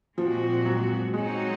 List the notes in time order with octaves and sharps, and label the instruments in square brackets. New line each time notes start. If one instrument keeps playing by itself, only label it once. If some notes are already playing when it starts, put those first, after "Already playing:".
[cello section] A#2 G#3 C4 F#4 [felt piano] F3
[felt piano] F#3
[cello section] F#3 C4 D#4 F#4 C#5 [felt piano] G#3